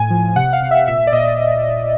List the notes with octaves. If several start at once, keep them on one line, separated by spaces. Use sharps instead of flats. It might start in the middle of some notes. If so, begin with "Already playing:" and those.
Already playing: A2 G#5
F3
C3 F#5
F5
C3
E5
A#2 E5
D5
A#2 D#5